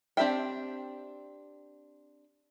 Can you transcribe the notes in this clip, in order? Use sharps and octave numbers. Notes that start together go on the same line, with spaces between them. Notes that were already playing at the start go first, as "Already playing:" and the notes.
C4 D4 G4 E5 G5